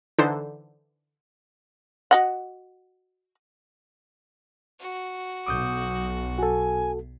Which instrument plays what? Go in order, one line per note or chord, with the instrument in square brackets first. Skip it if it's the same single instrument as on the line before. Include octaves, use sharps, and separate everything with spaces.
[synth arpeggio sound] D3 E3 D4 D#4 A4 C5
[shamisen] F#4 D#5 F#5
[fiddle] F#4
[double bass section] B1 [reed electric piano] D6 D#6 G6
[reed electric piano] F#4 A4 [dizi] G#5